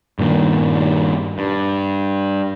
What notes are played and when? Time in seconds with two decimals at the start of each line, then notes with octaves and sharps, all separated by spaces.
0.19 G2 A#2 D#3
1.38 G2